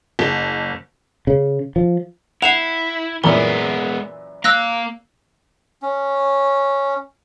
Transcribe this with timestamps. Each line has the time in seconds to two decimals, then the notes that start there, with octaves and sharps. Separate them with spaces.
0.19 F#1
1.27 C#3
1.76 F3
2.42 E4 F#5 C7 E7 F7
3.24 F#2 A#2 E3 G#3 B3 A#4
4.44 A#3 F5 E6 F#6 A#6
5.82 C#4